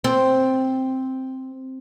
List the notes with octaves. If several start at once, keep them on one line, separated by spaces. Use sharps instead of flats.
C4